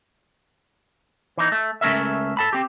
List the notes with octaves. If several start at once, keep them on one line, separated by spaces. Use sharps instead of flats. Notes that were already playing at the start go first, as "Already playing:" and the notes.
E3 D#4
A3
C#2 A3 C#4 A#4 E5
A4 A5 B5
C4 G4